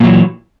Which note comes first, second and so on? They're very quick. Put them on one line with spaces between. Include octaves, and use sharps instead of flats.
A#2 F#3 E3